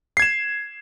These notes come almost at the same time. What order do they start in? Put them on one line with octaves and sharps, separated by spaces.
C7 G#6 E7